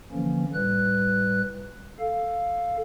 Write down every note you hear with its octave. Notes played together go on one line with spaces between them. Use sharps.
D3 E3 F3 A#3 C#4
A2 G3 B4 F#6
A4 F5